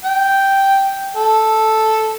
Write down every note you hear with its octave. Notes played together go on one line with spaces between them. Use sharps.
G5
A4